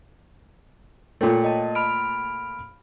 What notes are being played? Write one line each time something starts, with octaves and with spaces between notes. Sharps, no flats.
A#2 A3 C#5 G5
D#5 A5
B5 F6 D7